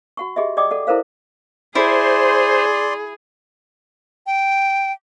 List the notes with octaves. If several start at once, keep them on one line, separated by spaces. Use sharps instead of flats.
F#4 F#5 C#6
G4 G#4 D#5 E5
D5 D#5 G5 D6 D#6
A4 D5 F#5
E4 A4 A#4 C5 F5
E4 G#4 C5 D5 C6
G5